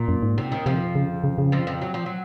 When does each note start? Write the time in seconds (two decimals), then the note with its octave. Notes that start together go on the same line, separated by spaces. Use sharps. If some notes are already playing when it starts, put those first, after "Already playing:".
Already playing: A#2
0.08 F#2
0.23 G#2
0.38 C3
0.51 D#2 D#3
0.66 F2 C3 F3
0.95 C#3
1.24 C#3
1.38 C#3
1.52 F2 F3
1.67 F2 F3
1.82 F#3
1.94 F3
2.06 F#3